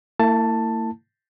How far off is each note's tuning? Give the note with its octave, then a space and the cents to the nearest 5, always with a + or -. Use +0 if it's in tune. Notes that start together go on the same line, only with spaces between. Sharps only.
A#3 -45 E4 +0 A5 +10